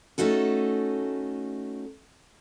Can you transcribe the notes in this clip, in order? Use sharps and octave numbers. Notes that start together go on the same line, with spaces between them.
A3 C#4 D#4 F#4 A4